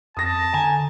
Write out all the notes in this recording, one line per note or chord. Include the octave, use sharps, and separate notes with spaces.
F2 A5 D#6 A#6
D3 G#5 A#5